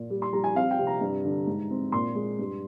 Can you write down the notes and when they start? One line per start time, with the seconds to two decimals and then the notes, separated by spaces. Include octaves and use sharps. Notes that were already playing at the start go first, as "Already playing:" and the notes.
Already playing: A#2
0.10 G3
0.22 C6
0.33 G3 A#5
0.44 G#5
0.55 C4 F5
0.71 G5
0.78 C3
0.87 A#5
1.01 G2
1.25 D3
1.47 G#2
1.70 C4
1.92 A#2 C6
2.15 G#3
2.39 G2